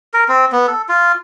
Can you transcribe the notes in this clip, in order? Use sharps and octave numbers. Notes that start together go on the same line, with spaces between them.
A#4
C4
B3
A4
F4